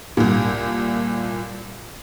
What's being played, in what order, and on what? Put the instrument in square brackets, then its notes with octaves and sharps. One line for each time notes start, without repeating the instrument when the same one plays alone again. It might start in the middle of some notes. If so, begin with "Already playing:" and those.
[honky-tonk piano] C2 A#2